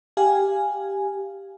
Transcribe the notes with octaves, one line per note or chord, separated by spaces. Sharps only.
G4 F5 G#5